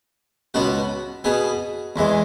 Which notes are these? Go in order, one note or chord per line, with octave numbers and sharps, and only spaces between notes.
C#2 B2 B3 F#4
B2 B3 G#4
E2 E3 G#3